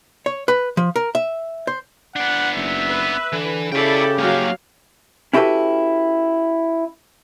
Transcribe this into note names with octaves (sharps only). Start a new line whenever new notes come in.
C#5
B4
F3
A#4
E5
C5
B3 D4 F#5
F#1 E5
B4
D3 E3
C#3 E4 G4 A4 D5 E5 G5
F#3 A#3 C#4 F5
C#4 E4 F#4 G4 A4 B4